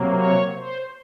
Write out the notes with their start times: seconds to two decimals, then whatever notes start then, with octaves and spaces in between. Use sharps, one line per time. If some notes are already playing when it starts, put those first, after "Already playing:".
Already playing: C3 F#3 A#3
0.13 C#5
0.57 C5